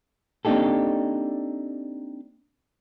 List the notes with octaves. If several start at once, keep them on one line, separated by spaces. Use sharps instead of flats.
A#3 C4 D4 D#4 G4 A4